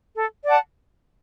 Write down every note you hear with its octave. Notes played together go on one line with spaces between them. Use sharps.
A4
D5 F#5 A5